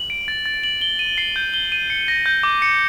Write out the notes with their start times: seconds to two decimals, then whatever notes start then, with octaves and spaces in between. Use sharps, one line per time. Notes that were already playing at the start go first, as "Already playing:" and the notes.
Already playing: F#7
0.10 D7
0.28 A6
0.46 A6
0.63 F#7
0.81 G7
0.99 D#7
1.18 C7
1.36 G6
1.54 G7
1.72 D#7
1.90 C#7
2.08 A#6
2.26 G6
2.43 D6
2.62 C#7